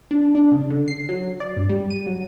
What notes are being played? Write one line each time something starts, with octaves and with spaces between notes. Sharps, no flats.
D4
D4
C#3
D3
C7
F#3
D5
G2
G3
D#7
F#3